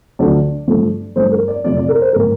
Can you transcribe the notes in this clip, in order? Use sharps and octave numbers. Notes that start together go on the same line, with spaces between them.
D2 D3 F3 A3 D5
G2 F3 A3
G2 F3 A3 C5
A#4
D5
F2 C3 F3 A3 D5
D5
A#4
C5
A2 G3 A#4